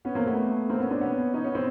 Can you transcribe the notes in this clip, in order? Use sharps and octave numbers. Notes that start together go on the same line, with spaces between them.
B3 C#4
A#3 C4
A3 B3
A#3 C4
B3 C#4
C4 D4
B3 C#4
C#4 D#4
B3 C#4
C4